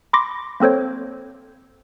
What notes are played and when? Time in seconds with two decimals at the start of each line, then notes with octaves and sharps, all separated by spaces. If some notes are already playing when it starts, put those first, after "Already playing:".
0.13 B5 C6 D6 A#6
0.60 A#3 C4 A4 C5 C#5